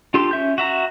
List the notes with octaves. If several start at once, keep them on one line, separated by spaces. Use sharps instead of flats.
D4 F4 G4 A4 C6
C#4 E5 G6
F#4 E5 A#5